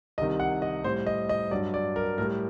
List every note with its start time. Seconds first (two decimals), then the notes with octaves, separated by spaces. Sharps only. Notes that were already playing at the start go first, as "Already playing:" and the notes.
0.18 C2 C3 D#3 D#5
0.40 F#5
0.62 D#5
0.84 A2 G3 C5
1.06 D#5
1.29 D#5
1.51 G2 F#3 D5
1.74 D5
1.96 A#4
2.18 A2 G3 A#4